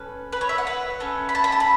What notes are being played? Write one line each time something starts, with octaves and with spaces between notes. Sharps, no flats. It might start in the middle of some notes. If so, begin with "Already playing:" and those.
Already playing: C#4 A4 B4
B4
C#5
E5
F#5
B4
A3 C#4 A4
B5
A5
B5
A5
B5